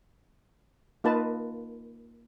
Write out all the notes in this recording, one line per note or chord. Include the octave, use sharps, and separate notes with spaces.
A#3 D#4 F4 A#4 B4 A5